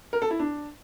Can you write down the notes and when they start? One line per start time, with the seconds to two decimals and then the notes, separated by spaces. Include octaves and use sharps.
0.13 A#4
0.22 A4
0.31 E4
0.39 D4